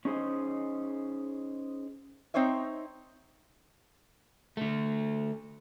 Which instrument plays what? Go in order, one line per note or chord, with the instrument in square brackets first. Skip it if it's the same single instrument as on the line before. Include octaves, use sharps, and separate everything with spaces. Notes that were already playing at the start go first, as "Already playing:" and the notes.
[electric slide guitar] C#4 D#4 G#4 C5 D#5
[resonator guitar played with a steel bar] C4 D#4 C5 C#5 E5
[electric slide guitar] D3 A3